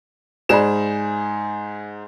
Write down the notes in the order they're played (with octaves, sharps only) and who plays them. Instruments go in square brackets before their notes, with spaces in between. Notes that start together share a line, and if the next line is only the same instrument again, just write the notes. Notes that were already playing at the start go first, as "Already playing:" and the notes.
[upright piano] G#2 G#4 E7 [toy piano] C5 D5 B5